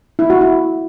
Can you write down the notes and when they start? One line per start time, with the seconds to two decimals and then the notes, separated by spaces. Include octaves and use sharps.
0.19 E4
0.30 F#4
0.41 E4